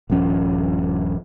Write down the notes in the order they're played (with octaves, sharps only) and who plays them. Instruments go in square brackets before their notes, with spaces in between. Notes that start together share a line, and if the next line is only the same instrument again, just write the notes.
[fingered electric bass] D#1 G2 F3 C#4